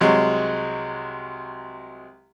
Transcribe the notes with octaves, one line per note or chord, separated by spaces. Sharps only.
C2 F#3 G#3